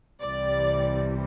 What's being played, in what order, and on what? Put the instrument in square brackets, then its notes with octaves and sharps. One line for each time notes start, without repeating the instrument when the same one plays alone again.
[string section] C2 C3 E3 G3 D5